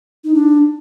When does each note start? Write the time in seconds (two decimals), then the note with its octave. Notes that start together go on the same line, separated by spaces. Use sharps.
0.24 D#4
0.34 D4